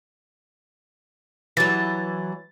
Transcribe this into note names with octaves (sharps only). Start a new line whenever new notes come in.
E3 F#3 A6